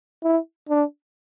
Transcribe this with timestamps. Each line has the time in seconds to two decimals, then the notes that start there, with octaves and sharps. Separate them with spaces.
0.24 E4
0.69 D4